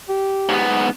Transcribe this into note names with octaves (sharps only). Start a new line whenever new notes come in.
G4
G#2 B3